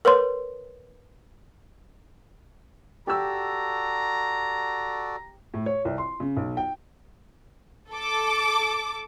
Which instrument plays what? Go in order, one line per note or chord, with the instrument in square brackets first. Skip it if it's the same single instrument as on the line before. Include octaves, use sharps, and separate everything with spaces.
[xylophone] A#4 B4 C#5 C6
[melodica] F#4 A4 D5 [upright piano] G4 E6 [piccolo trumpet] A#5
[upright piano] A2
C#5
C2
C6
C#3
B1
G5
[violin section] A4 D6